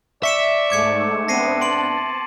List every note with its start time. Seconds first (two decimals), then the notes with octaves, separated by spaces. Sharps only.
0.23 D5 E5 C#6 C#7 E7
0.70 G#2 A3 D6 G#6 C#7
1.28 B3 C4 D4 A#6 C7 D#7
1.61 A5 C6 D7 F#7